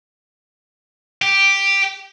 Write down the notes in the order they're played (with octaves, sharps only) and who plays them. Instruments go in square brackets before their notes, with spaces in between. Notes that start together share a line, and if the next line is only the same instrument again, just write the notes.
[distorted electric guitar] G4